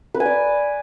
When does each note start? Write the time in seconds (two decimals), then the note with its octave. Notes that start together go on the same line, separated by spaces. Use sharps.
0.14 B4
0.20 G#5
0.26 D5